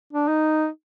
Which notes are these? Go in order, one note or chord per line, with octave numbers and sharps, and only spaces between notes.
D4
D#4